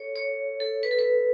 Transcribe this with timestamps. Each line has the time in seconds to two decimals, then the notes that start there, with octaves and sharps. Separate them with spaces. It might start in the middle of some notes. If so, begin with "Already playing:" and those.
Already playing: A4 C#5
0.16 C#5
0.60 A4
0.83 B4
0.91 A4
0.99 B4